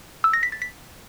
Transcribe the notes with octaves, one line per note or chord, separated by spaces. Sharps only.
E6
A#6
B6
A6
B6